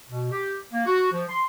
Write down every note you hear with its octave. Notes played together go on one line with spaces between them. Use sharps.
B2
G4
A#3
F#4
F3
C6